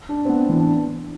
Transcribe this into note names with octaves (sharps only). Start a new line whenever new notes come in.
D4
C4
B3
E3
D4